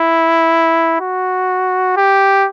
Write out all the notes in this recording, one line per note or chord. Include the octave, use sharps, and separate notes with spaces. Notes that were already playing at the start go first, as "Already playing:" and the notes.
Already playing: E4
F#4
G4